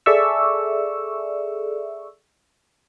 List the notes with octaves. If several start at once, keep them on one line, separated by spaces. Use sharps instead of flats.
G#4 A4 D5 E5 C#6 E6